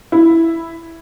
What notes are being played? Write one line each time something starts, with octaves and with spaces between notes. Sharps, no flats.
E4